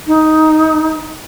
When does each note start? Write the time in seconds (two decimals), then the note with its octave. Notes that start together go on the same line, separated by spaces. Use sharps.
0.06 D#4